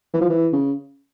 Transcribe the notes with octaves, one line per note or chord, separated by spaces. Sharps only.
E3
F3
E3
C#3